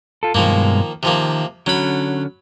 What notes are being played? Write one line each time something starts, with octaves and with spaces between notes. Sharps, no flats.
F4 A4
G2 B2 D#3 F3 G#3 A#3
C3 D#3 F3 A#3
D3 F#3 C#4 B5